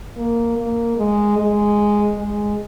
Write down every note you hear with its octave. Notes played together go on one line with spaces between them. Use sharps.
A#3
A#3
G#3
G#3
G#3